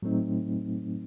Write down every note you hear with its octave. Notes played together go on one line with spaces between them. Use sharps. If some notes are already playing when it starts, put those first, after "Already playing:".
A2 F#3 A3 C4 D#4